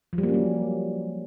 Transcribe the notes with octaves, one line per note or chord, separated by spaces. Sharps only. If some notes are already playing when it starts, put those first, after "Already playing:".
F3
G3
A#3
C#4
F#3